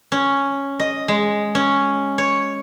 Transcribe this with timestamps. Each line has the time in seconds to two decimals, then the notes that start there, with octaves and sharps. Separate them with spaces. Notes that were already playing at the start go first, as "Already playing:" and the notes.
0.12 C#4
0.80 D#5
1.08 G#3
1.55 C#4
2.18 C#5